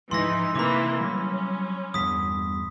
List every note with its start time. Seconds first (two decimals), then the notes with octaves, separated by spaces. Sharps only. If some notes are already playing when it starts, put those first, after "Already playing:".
0.11 G#2 E3 F3 G#3 D#4 C6 E6 A#6
0.55 C3 E3 A#3 E4 B5 D6
1.01 F#3 G3 C#4
1.94 E2 G2 B2 D#6 B6